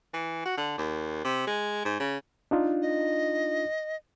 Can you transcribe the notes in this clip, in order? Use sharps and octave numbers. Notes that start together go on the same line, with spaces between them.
E3
F#4
D3
D#2
C3
G#3
G#2
C#3
D4 D#4 F4
D#5